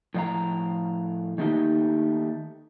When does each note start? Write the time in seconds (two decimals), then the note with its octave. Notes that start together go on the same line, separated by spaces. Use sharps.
0.14 A2 F3 D5 F5 A#5
1.38 D#3 A3 A#3 D#4 G4